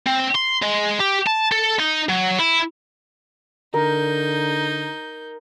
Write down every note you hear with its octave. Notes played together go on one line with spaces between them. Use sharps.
C4
C6
G#3
G4
A5
A4
D#4
F#3
E4
D3 D#4 A#4 G6